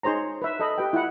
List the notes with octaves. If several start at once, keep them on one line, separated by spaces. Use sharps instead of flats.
D#4 G#4 C5 C#5 A#5
B4 E5
A4 D#5 B5
G4 B4 G5
E4 F4 F#5 B5